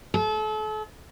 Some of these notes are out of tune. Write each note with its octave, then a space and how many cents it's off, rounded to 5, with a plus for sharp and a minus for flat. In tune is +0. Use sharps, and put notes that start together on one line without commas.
A4 -35